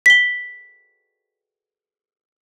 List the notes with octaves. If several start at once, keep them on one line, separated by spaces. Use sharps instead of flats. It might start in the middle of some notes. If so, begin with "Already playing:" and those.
B6 G7